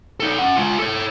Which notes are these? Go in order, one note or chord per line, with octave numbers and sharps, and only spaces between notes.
D#4 A4
C#4 F#5
G#3 F4
A4 C#5